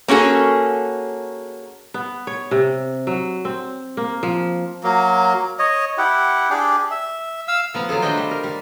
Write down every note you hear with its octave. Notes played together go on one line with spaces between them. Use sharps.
A#3 C#4 F#4 G#4 A4
B3
C#5
C3
F#3
C4
A#3
F3
F#3 A#3
C#5 D#5
E4 G4 F#5
D4 G4 G#4
E5
F5 E6
F3 B3 A#5
F#3 F4 G#4 A4
G3 A3 D4 C5 D#5 G5
G3
A#4
G3